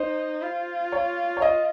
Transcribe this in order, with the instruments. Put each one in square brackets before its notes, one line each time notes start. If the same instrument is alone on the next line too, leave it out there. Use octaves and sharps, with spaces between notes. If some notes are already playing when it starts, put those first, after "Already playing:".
Already playing: [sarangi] D#4 [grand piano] C5
[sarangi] F4
[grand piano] C#5
C#5
D#5